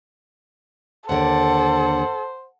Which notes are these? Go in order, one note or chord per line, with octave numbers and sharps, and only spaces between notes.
D#2 D3 A4 C5 F#5